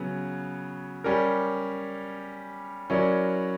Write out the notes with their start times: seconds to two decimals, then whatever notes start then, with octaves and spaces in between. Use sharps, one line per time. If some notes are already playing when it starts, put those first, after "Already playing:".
Already playing: C#3 F#3 B3
1.04 G3 C#4 G4 A#4
2.90 F#3 C#4 E4 A#4 D5